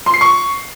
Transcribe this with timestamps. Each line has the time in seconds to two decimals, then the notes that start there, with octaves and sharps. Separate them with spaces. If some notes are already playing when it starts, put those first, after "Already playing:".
0.06 C6
0.14 C7
0.21 C#6